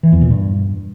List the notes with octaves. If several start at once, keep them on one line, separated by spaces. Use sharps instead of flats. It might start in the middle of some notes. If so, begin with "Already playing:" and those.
E3
E2
A#2
G2